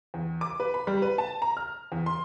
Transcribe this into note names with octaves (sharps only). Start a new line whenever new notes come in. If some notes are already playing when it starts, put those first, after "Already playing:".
E2
D6
B4
B5
G3
B4
A5
A#5
F6
E2
C6